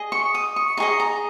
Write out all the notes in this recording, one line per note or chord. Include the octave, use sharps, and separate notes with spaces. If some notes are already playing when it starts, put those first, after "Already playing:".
Already playing: G#4 D#5
C#6
D#6
C#6
D#4 G#4 D#5 C#6
A#5